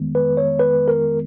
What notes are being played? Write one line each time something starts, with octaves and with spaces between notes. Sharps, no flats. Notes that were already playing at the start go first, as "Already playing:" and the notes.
Already playing: F2 D#3 G#3 B3
B4
C#5
B4
A#4